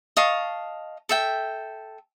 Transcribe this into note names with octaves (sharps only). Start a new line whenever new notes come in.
D#5 F5 A5 C#6
A4 E5 G5